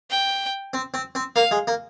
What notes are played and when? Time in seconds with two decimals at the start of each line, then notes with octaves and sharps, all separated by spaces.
0.11 G5
0.73 C4
0.94 C4
1.15 C4
1.36 A#3 F5
1.51 G#3
1.67 A#3